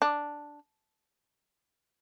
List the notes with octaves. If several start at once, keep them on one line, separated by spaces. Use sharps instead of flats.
D4